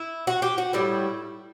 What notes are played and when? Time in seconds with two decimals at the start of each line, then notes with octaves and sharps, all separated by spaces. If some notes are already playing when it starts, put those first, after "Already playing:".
Already playing: E4
0.27 F#4
0.42 G4
0.58 F#4
0.73 A2 G3 E4